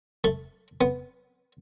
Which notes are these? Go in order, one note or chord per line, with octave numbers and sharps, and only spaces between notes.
A3
B3